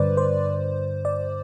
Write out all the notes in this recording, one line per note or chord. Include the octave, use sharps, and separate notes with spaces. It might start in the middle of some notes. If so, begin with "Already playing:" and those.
Already playing: G2 D3 B4 C5 D5
C5
D5